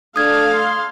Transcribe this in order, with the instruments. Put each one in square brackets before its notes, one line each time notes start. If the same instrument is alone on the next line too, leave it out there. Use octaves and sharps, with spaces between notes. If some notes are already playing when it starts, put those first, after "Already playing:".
[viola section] A3 A4 F5 [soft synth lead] D4 [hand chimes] D#6 G#6
[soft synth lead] C6